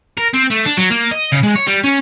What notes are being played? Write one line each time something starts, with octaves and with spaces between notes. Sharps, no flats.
A#4
C4
A3
D4
F#3
A#3
D#5
C#3
G#3
C#5
G3
C#4